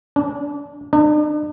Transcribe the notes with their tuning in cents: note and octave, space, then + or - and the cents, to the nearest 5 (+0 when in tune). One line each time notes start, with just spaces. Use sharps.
D4 -25
D4 +45